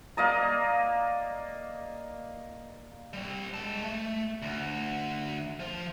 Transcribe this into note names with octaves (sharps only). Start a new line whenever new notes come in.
A#3 D5 D#5 A#5
G3 C4
G#3 A5
A3
D2
F3